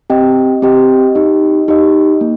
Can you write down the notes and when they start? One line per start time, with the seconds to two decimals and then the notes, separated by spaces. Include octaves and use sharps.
0.10 C4 G4 D#5 G5
0.62 C4 G4 D#5 G5
1.15 D#4 G4 D#5
1.68 D#4 G4 D#5
2.21 A#3